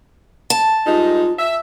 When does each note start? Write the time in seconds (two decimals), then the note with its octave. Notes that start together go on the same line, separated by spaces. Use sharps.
0.50 A5
0.86 G2 G#3 D#4 F4
1.39 E5